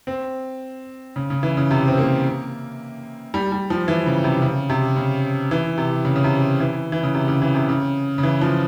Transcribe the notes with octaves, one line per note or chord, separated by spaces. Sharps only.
C4
C#3
C#3
E3
C#3
C3
C4
A#3
G3
G3
F3
E3
C#3
C3
C#3
C3
C#3
E3
C3
C#3
C#3
C3
E3
E3
C#3
C3
C#3
E3
C3
C#3
C#3
E3
F3